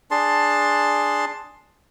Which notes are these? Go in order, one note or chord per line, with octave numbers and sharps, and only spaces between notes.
D4 G#4 A5 C6